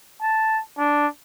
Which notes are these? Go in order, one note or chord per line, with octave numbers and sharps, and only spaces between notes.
A5
D4